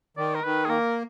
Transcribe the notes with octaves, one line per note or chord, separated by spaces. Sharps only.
D#3 D5
A#4
D#3 B4
G#4
A#3 A#4